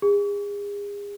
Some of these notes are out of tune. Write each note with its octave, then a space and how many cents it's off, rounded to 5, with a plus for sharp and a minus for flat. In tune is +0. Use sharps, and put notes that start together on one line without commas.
G#4 -35